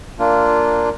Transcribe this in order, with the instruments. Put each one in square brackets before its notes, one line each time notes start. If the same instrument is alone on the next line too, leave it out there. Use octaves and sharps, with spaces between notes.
[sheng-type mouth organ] A#3 D4 F4